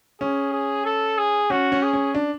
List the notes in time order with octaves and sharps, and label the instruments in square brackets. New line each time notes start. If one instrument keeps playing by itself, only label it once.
[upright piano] C#4 [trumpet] G#4
[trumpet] G#4
A4
G#4
[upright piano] C#4 [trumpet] F#4
[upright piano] C#4
[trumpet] G#4
[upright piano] C#4
D4